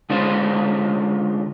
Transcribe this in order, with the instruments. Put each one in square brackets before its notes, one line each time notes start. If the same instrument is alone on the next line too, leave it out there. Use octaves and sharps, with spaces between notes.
[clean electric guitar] D3 G#3 C#4 F4 B4 C5